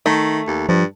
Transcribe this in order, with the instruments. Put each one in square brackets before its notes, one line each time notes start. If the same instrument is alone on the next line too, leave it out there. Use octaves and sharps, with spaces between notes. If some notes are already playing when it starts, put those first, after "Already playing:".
[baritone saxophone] D#3 [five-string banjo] A3
[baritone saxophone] D#2
[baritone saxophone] G2 [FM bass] F3